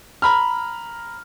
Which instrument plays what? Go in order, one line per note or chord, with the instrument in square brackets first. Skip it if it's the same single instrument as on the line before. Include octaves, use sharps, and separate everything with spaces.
[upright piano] A#5 B5 F6